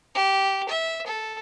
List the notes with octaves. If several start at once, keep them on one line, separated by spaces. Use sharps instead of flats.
G4
E5
A4